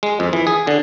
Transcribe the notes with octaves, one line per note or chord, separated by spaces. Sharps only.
G#3
F2
E3
G#4
D3